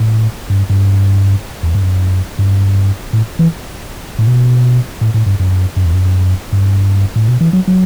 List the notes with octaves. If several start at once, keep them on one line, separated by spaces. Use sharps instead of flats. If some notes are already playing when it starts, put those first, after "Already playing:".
Already playing: A2
G2
G2
E2
G2
F#2
G2
A2
E3
A2
B2
A2
A2
G2
F#2
F#2
E2
F#2
G2
A2
B2
E3
F#3
F#3